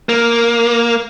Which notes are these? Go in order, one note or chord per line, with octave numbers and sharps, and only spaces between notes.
A#3